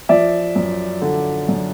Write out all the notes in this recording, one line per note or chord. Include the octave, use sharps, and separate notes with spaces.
F3 D5 E5
F#2
D3
F#2